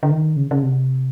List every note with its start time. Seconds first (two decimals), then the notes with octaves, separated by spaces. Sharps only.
0.03 D3
0.11 D#3
0.36 C#3
0.51 C#3
0.63 C3